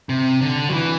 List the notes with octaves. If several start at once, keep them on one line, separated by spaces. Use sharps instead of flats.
C3
D3
F#3
E3